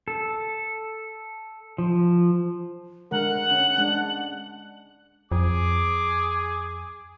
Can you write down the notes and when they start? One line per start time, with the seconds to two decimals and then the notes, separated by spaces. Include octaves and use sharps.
0.08 A4
1.78 F3
3.11 D3 G#3 A#4 F#5
3.51 C#4
3.78 G#3 D4
5.32 F2 G#4 D6